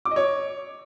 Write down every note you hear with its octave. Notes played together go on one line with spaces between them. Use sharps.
D6
D#5
C#5